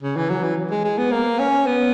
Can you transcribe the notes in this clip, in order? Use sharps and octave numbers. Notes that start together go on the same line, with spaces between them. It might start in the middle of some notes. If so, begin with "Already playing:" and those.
C#3
E3
F#3
E3
G#3
G#3
B3
A#3
C#4
B3